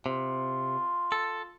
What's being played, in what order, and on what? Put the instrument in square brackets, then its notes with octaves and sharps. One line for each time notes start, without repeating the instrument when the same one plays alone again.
[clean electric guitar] C3 [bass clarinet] F4
[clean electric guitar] A4